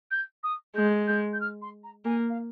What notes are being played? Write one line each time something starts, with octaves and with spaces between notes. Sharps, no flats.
G6
D#6
G#3 G6
G6
G6
F6
C6
A#5
A#3 G#5
F5